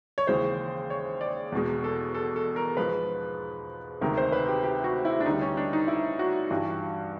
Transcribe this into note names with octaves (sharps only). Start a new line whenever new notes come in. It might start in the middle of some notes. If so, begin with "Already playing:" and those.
C#5
D#2 C#3 E3 G#3 C5
C#5
D5
E2 B2 G#3
A4
A4
A4
A#4
G#2 F3 G#3 B4
D2 C3 D#3 G#3 A#4
C5
B4
G4
G4
F#4
E4
D4
D2 D3 G3 D#4
C#4
D4
D#4
E4
F#4
G2 E3 G3